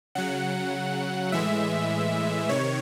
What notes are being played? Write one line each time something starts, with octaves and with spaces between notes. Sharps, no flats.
C#3 F#3 F#5
A2 E3 G#3 E5
C3 D#3 C#5